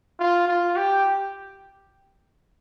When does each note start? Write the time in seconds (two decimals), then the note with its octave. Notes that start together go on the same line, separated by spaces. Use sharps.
0.19 F4
0.48 F4
0.76 G4